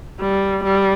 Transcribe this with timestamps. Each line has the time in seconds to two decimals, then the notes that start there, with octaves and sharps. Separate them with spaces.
0.20 G3
0.64 G3